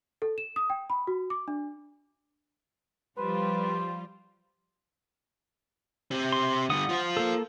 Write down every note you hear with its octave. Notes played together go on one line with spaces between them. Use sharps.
A4
E7
D#6
G5
B5
F#4
D6
D4
F3 G3 F4 B4 C5
C4 G4
C6
D3 G3 F#5 D#6
F4 C5
A#3 A4